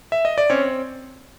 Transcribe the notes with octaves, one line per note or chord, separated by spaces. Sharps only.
E5
D#5
D5
C4 C#4 C#5